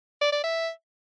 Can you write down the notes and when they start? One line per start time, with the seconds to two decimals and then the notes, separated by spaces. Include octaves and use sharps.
0.21 D5
0.33 D5
0.44 E5